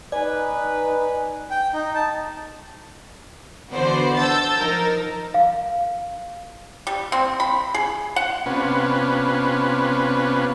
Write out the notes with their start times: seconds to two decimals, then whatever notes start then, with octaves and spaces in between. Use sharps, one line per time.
0.12 D#4 B4 D5 G#5
1.51 G5
1.74 D#4
1.95 A5
3.71 D3 E3 B3 F#4 C5 D5
4.16 A5 E6 G6 A6
4.59 F3 D#4 A#4
5.34 F5
6.87 G3
7.12 C4
7.40 B5
7.74 G#4
8.16 F#5
8.46 C3 B3 C#4 D4 F4 B4